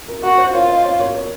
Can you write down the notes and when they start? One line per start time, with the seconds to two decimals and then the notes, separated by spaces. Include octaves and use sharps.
0.08 A#4
0.23 F#4 A#4
0.38 C5
0.54 F4 A#4 C#5
0.69 C5 D#5
0.84 C#5 F5
0.99 A#4 C#5
1.15 A#4 C#5